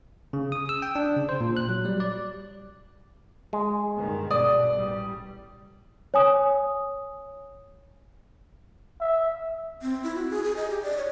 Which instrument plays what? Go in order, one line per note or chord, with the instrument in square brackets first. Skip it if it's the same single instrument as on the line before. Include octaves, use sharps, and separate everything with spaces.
[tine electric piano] C#3
D#6
E6
G5
D4
C#3
C5
A#2
F#6
F#3
G3
D5
[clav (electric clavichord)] G#3
[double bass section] G2 D#3
[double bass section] B2 [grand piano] D5 D#6
[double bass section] A1 G3
[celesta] C#5 G#5 D#6
[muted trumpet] E5
[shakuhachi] C4
E4
F#4
G#4
G#4
D#5
G4
D5
C#5